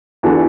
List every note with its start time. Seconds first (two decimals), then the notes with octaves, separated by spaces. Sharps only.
0.23 E2 E3 D4 F#4 A4